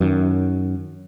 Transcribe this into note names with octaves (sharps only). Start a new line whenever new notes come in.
F#2 D#3